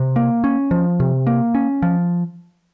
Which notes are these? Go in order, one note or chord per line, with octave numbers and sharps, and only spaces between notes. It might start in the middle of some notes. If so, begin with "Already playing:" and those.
Already playing: C3
A#3
C#4
F3
C3
A#3
C#4
F3